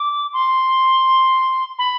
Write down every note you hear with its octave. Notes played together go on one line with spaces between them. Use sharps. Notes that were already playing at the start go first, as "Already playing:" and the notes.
Already playing: D6
C6
B5